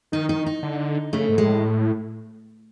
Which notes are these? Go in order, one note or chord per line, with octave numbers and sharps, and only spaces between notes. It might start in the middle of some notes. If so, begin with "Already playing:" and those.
D#3 D#4
D#4
D#4
D3
C#3 A3
G#2
A2 G#3